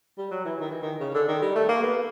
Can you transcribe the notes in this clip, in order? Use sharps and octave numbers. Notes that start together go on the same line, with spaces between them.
G3
F#3
E3
D#3
E3
D#3
C#3
D3
D#3
G3
A3
A#3
B3